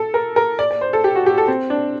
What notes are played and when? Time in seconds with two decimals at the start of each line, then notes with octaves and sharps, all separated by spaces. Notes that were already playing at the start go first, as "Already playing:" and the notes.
Already playing: A4
0.14 A#4
0.36 A#4
0.59 D5
0.71 D5
0.81 C5
0.93 A4
1.04 G4
1.15 F#4
1.26 G4
1.38 A4
1.48 C4
1.70 D4